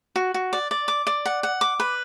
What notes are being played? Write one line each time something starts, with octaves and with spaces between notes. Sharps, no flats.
F#4
F#4
D5
D5
D6
D5
F#5
F#5
D6
B4